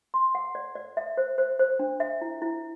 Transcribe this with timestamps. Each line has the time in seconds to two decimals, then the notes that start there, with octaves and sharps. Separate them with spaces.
0.14 C6
0.35 F#5
0.55 D5
0.75 D5
0.97 E5
1.17 C5
1.38 C5
1.59 C5
1.79 D4
2.00 E5
2.21 E4
2.42 E4